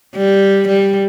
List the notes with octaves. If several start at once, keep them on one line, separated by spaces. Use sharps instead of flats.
G3
G3